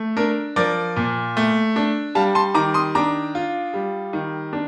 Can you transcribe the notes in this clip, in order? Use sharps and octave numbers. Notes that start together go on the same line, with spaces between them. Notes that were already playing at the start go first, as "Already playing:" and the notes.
Already playing: A3
D4 A#4
F3 A#4 D5
A#2
A3
D4
G3 F5 A5
A5 C6
D#3 A#5 D6
C6 D#6
D4 A#5 D6
F4
G3
D#3
D4